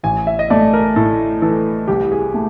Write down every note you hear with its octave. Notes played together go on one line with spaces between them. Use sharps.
A1 G#5
E5
D#5
A3 D5
A#4
A2 A4
E3 A4
C2 G4
G#4
A3